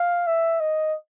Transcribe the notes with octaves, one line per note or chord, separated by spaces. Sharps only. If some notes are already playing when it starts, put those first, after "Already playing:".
Already playing: F5
E5
D#5